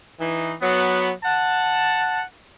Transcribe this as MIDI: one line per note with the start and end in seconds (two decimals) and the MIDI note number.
0.20 0.53 52
0.20 0.53 63
0.62 1.11 54
0.62 1.11 59
1.25 2.24 78
1.25 2.24 81